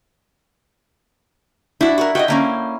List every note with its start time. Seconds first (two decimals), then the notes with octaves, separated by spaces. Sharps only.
1.81 D4 E4 F#4
1.98 F#4 A4 A#4
2.15 F#4 D5 D#5 G5
2.28 D3 A#3 C#4